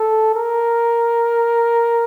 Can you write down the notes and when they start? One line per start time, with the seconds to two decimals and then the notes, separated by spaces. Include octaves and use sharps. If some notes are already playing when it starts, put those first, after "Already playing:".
Already playing: A4
0.34 A#4